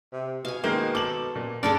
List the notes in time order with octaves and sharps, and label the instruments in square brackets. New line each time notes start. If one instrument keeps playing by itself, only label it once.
[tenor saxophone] C3
[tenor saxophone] B2 [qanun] F5 G#5
[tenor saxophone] B2 [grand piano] D#3 G#3 A#3 [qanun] C5
[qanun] A4 [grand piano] D6 F#7
[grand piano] A#2
[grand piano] G2 [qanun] D4 G#4 A4 [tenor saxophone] D5